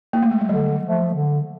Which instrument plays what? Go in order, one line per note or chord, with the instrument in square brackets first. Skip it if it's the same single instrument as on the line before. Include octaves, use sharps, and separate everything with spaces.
[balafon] A#3
A3
G#3
G3
[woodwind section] D3 [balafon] F#3
[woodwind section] F3 A3
D3